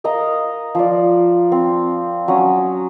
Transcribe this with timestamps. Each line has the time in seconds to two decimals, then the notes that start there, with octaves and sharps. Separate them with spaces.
0.04 A#4 D#5 F5 A#5
0.75 F3 D5
1.52 C4
2.28 F#3 C#4 D#6